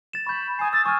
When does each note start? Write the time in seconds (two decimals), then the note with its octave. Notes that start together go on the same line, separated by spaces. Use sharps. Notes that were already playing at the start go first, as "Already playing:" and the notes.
0.13 A6 E7
0.27 B5 C#6 G6
0.59 G#5 D#6 C7
0.73 E6 A6
0.86 G#5 C#6 F6